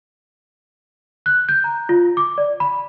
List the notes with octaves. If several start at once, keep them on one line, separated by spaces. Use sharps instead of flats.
F#6
G6
A#5
F4
D6
D5
B5